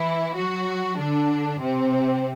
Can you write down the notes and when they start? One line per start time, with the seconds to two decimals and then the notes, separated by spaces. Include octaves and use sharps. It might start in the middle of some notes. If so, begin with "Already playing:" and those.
Already playing: E3 E4
0.36 F#3 F#4
0.98 D3 D4
1.60 C3 C4